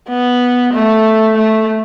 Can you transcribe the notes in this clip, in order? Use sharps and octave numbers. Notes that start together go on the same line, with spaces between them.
B3
A3
A3